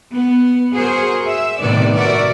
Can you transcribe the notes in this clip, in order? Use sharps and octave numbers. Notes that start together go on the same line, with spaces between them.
B3
F#4 G#4 A#4 C5
E5
A2 C3 D#3 B3 B4 D5
F#4 A#4 D5 E5